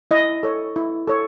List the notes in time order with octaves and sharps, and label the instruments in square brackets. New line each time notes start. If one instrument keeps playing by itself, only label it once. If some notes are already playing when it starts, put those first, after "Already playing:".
[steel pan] E4 D#5
A4 C#5
E4
A4 C#5